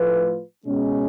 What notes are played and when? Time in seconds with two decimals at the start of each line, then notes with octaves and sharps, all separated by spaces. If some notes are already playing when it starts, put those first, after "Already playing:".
Already playing: A2 F3 A3 F4 B4
0.66 B2 G#3 C#4